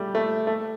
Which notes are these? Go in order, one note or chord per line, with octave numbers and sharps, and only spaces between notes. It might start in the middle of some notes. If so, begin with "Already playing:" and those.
Already playing: G3 A3
A3
A3